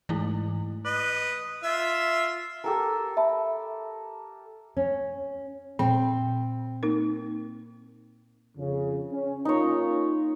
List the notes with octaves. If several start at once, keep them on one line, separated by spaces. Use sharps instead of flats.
G#2 E3 A3 E4
B4 D#5
F4 E5
G4 A4 A#4
E5 A5 B5
C#4
A#2 C4
A#3 D#4 A#4
F2 C#3
C#4
A#3 C#4 D#4 F4 C#5